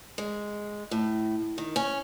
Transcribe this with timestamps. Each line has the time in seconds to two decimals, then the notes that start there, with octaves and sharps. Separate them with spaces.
0.18 G#3
0.91 A2
1.58 D#3
1.76 C#4